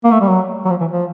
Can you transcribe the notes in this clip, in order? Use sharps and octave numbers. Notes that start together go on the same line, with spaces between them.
A#3
A3
G3
F#3
F#3
F3
E3
F3